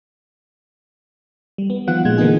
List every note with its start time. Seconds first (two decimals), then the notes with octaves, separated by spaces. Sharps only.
1.58 G3
1.70 B3
1.87 D#3 F3 B3 F4 F#5 F#6
2.05 A#2 G#3 F4 G#6
2.18 D3 E3 A#3 B3 D#4 G#4